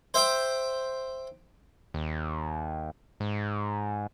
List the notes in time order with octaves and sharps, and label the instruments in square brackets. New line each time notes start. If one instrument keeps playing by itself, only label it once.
[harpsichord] C5 E5 G5 D6
[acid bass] D#2
G#2